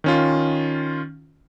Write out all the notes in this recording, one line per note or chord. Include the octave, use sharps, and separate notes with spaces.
D#3 C#4 F4